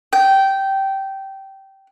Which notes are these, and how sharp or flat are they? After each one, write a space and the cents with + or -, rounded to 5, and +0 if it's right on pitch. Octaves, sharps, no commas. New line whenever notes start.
G5 -15